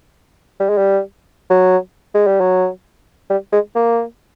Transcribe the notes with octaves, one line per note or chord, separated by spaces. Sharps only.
G3
G#3
G3
F#3
G#3
G3
F#3
G3
G#3
A#3